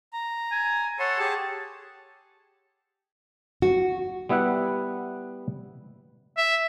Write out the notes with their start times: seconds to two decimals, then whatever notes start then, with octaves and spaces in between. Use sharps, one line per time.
0.13 A#5
0.52 G#5
1.00 A4 C#5 F#5 C6
1.19 G4 G#4 A5
3.62 F#4
4.29 G3 B3 E4 E5 F#5
6.37 E5